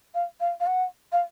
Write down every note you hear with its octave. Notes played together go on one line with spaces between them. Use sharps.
F5
F5
F5
F#5
F5